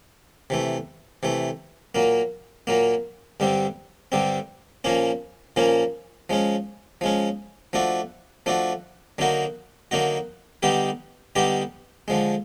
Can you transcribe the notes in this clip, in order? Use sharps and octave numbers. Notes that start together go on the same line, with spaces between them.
C3 E3 A3
C3 E3 A3
A#2 F#3 A#3
A#2 F#3 A#3
G2 D3 G3 C4
G2 D3 G3 C4
A#2 F3 A#3 C#4
A#2 F3 A#3 C#4
F3 G#3 C#4
F3 G#3 C#4
F3 A3 D4 F#4
F3 A3 D4 F#4
D3 F#3 A#3 D#4 F#4
D3 F#3 A#3 D#4 F#4
D3 G3 B3 D#4 G4
D3 G3 B3 D#4 G4
D3 F3 G#3